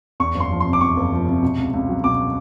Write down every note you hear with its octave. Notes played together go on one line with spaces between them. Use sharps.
E2 C#6
F#1
C6
F3
C6
C3
D6
E2 C#6
F#1
F3
C3
B2
C#2
C#2
F#3
B2 D6